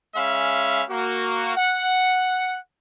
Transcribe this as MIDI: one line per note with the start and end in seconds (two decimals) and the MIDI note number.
0.16 0.83 56
0.16 0.83 61
0.16 0.83 76
0.16 0.83 77
0.16 0.83 83
0.90 1.51 58
0.90 1.51 66
1.56 2.56 78